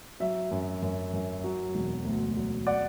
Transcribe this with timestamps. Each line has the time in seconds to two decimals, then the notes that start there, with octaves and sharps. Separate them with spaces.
0.20 F#3 E5
0.51 F#2
0.82 F#2
1.13 F#2
1.44 F#3
1.75 E1
2.04 D2
2.36 F#3
2.67 D5 F#5